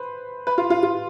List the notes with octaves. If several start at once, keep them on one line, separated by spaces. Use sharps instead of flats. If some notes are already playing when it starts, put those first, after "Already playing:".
Already playing: B4 C5
B4
F4
F4
F4